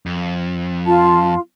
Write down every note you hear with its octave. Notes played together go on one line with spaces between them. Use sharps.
F2
F4 A5